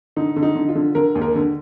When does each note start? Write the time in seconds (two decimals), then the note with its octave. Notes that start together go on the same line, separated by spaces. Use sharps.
0.17 D3 D#4
0.36 D3
0.43 D#4
0.55 D3
0.69 F4
0.75 D3
0.95 D3 A#4
1.15 D#2
1.21 A#4
1.35 D3